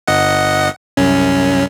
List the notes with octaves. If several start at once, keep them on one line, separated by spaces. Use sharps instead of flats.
G1 D#5 F#5
C2 F#2 C#4